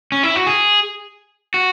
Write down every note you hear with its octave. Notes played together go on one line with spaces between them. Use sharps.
C#4
E4
F#4
G#4
F#4